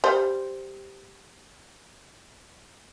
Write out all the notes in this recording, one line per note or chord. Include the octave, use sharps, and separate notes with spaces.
G3 C5